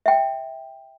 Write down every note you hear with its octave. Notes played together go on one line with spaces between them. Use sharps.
E5 G5